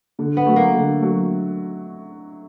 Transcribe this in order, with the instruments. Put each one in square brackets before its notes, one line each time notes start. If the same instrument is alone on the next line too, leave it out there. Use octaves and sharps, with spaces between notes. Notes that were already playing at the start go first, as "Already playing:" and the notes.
[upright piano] D3
[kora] B3
[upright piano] F#3 A3
[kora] A#3
[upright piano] D3
F#3 A3